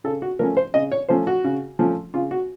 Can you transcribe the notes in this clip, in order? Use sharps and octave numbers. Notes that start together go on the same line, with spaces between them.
C#3 A4
F#4
F3 A3 C#4 A#4
C5
C#3 D#5
C#5
F3 A3 C#4 C5
F#4
C#3
F3 A3 C#4
C#3 F4
F#4